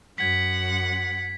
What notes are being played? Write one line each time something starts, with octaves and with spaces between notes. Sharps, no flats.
F#2 F#5 G#6 B6